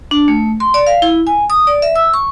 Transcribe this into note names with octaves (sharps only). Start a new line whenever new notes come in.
D4
A3
C6
D5
F5
E4
G#5
D#6
D5
E5
E6
C#6